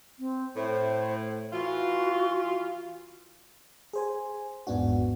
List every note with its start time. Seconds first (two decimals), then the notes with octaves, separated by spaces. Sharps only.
0.19 C4
0.56 A2 C5
1.53 E3 F4 F#4
3.93 G#4 C5 G#5
4.67 G#1 E2 G#2 B3 D4 F#4